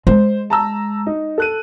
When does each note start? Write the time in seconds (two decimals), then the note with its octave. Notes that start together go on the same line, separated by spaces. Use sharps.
0.07 G#3 C5
0.50 A5 A#5 E6
1.06 D#4
1.38 A4 F#6 D#7